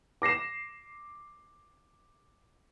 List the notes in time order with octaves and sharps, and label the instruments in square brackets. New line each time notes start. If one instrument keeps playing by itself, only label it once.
[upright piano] D6 A#6 C7 E7